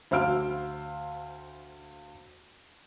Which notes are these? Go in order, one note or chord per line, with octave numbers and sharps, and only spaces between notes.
D2 C5 F5 E6 F6 D7